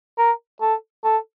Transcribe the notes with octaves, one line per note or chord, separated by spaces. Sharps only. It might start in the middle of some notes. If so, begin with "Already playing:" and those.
A#4
A4
A4